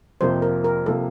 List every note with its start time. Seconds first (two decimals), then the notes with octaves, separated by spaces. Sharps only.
0.21 F2 C3 F3 A#3 C5
0.42 A#4
0.64 A#4
0.86 C3 F3 A#3 A4